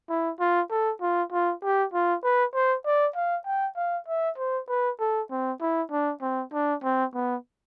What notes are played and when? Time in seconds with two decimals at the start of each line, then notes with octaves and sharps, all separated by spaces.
0.09 E4
0.40 F4
0.71 A4
1.02 F4
1.32 F4
1.64 G4
1.94 F4
2.24 B4
2.54 C5
2.86 D5
3.16 F5
3.46 G5
3.77 F5
4.08 E5
4.38 C5
4.69 B4
5.00 A4
5.31 C4
5.61 E4
5.91 D4
6.22 C4
6.53 D4
6.84 C4
7.15 B3